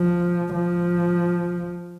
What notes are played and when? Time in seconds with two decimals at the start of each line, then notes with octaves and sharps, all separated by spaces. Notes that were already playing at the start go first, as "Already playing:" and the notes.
Already playing: F3
0.53 F3